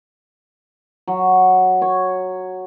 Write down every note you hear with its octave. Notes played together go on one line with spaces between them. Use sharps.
F#3
C#5